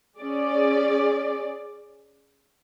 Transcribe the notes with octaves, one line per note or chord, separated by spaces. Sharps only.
C#4 G#4 D5